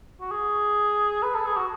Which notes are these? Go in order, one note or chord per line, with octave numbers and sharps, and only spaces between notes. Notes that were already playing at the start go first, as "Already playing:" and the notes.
F#4
G#4
B4
A4
G#4
F#4